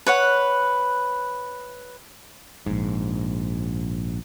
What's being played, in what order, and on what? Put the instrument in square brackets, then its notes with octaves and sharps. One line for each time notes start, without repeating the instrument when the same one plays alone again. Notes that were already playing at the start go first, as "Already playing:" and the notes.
[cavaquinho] B4 C#5 F#5
[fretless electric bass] A#1 G#2